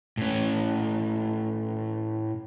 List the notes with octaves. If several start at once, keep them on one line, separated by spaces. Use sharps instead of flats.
A2 C#4